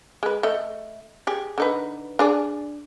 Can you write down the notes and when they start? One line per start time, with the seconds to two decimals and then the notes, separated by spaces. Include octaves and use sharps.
0.23 G#3 B4
0.43 A3 D#5
1.27 G4 G#4
1.58 D3 D#4 B4
2.19 D4 G#4 D5